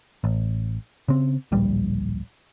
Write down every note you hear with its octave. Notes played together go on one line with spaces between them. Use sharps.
A1
C#3 C4
D1 A#1 G3